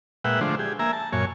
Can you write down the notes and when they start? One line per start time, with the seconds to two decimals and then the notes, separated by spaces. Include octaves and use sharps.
0.24 A#2 G#3 B4 E5 F#5 G5
0.41 D3 F3 G#3 A3 D4 C5
0.59 G4 G#4
0.79 A#3 E5 G#5 A#5
0.93 A5
1.13 F#2 A#2 C#5 G#5